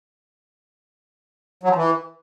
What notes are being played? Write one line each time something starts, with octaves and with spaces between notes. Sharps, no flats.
F#3
F3
E3